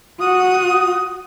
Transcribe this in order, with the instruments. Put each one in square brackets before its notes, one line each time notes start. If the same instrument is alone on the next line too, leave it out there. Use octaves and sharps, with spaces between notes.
[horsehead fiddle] F#4 [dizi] D#6